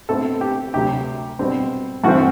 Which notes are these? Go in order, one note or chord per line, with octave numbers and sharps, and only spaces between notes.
B2 A3 C4 A4
G4
D2 C3 F#3 G4
B2 G3 C4
G2 E3 A3 C4 F#4